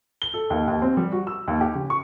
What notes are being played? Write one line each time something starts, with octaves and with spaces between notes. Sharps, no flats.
G7
A4
D#2
D#2
C4
G3
F#4
E6
D#2
G4
C#3
C#6